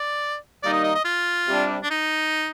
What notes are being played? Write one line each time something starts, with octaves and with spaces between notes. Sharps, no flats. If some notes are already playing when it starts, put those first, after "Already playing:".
Already playing: D5
D#3 G3 A#3 D#4 D5
D#5
D#5
D#5
F4
C3 G3 D4
D4
D#4